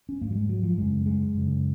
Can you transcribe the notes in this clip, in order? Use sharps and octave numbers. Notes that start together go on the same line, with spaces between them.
C#4
G#2 A#3
F#3
G#3
F#3
F3
F#2 C#3 G#3
G#3
F#2 C#3